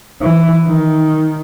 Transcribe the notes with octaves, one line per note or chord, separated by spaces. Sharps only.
E3
D#3